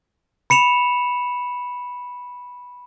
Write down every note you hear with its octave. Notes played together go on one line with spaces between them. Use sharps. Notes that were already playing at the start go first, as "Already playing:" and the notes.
B5 C#7 E7 F7